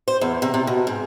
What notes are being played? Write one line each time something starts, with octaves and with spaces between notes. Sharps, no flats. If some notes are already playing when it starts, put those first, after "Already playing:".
C5
E2
C3
C3
B2
G#2